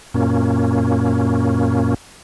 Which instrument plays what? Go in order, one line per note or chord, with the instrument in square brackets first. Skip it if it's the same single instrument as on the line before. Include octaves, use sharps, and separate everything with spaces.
[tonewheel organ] F#2 A#2 A#3 C#4